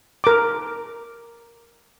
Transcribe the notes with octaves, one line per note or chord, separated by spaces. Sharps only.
A#4 D6